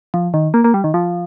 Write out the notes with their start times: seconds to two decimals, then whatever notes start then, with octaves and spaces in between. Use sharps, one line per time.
0.14 F3
0.34 D#3
0.54 A#3
0.64 A#3
0.74 G3
0.84 D#3
0.94 F3